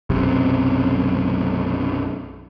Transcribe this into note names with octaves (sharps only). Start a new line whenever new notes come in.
B1 F#2 C3